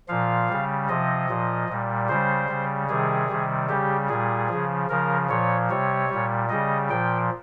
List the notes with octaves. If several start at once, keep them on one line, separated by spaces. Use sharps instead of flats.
A#2 F3 F5
C#3 G3
C3 F3 D#5
A#2 F3
A#2 G3
C#3 G3 C5
C#3 G3
C3 D#3 G3 G#4
C3 D#3 G3
C#3 G3 G4
A#2 G3 G#4
C#3 F3
C#3 F3 A#4
A#2 F3 C#5
C3 G3 C#5
A#2 G3
C#3 G3 D#5
A#2 F3 G5